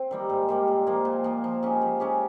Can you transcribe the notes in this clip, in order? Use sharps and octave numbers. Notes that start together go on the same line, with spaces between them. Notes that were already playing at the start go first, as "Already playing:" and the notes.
Already playing: C4
D#3 G3 A#3
G#2
D#3 G3 A#3
A#2
F3 A#3
A#2
F3 A#3
F3
G#3 C#4 G4
F3
G#3 C#4 G4